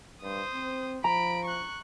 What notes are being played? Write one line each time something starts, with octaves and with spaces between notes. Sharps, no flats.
G2 C5 D#6
C4
F3 A#5 B5 D7
C#6 F#6